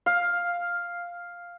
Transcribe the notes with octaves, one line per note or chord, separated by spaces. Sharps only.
F5